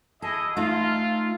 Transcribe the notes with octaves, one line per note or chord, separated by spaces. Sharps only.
E4 G#4 A4 D#5
A3 D#4 F4